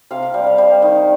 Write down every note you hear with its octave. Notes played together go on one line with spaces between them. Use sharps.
C3 F5
F5
G3
F5
G3 F5
D#3